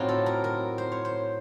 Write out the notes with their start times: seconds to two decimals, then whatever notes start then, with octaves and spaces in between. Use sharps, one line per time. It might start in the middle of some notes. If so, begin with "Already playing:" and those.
Already playing: A2 F#3 C4 D#4 F4
0.09 A4
0.26 A#4
0.44 A#4
0.78 C5
0.92 C#5
1.05 C5